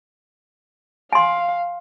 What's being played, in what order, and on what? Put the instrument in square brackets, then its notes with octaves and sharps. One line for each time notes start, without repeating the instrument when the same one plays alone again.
[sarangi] F5 [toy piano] G#5 C6